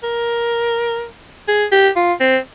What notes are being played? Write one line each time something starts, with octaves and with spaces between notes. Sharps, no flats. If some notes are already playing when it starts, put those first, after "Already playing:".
A#4
G#4
G4
F4
C4